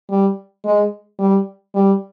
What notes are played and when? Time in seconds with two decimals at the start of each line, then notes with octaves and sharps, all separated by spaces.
0.10 G3
0.65 G#3
1.19 G3
1.75 G3